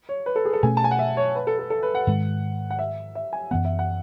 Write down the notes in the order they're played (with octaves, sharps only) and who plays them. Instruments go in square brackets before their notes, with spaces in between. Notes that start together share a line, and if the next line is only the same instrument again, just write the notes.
[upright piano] C#5
B4
A4
G#4
A4
[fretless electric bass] B2 A3 C#4 [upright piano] G#5
[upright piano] A5
G#5
F#5
E5
C#5
B4
A4
A4
A4
B4
F#5
[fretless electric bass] G#2 D#3 G#3
[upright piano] F#5
E5
E5
G#5
[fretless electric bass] F#2 E3 B3 [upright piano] F#5
[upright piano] E5
F#5